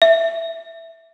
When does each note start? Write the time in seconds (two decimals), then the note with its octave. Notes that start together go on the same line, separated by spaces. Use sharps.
0.02 E5